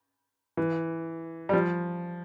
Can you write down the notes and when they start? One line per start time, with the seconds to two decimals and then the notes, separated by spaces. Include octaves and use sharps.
0.57 E3
1.49 G3
1.53 F3